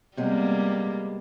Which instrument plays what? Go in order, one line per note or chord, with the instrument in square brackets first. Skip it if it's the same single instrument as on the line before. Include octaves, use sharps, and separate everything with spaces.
[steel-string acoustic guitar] C3 G#3 B3 [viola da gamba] G3 A#3